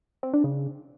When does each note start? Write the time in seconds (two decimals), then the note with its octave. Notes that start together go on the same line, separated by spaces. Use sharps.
0.23 C4
0.34 D4
0.44 C#3